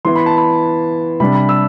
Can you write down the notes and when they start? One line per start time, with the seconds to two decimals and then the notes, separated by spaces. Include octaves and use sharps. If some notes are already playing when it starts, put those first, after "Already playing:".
0.05 E3 B3 E4 C6
0.16 B5
0.26 A5
0.37 B5
1.20 C3 G3 D4 B5
1.35 B5
1.49 E6